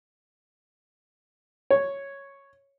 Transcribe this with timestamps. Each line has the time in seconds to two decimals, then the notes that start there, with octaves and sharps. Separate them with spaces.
1.70 C#5